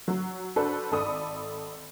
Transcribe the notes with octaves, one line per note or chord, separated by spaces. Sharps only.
F#3
D4 F#4 A4 B4 C5
G#1 A4 D5 B5 D#6